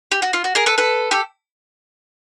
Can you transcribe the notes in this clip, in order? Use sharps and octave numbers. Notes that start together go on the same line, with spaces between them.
G4
F#4
F4
F#4
G#4 A#4
A4 B4
A4 B4
G4 A4